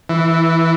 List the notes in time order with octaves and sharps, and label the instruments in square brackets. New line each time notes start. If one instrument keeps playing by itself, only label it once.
[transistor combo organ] E3